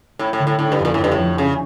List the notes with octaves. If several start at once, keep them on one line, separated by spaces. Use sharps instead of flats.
A2 E4
A2
D3
A2
A2 D4
G2
F2
A#2
A2
F2
G2
A2
F2
E2 C#3